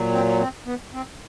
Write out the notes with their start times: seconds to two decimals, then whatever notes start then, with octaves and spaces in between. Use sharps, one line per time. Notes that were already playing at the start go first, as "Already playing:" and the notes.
Already playing: A#2 F#3
0.13 C4
0.40 C4
0.67 B3
0.94 C4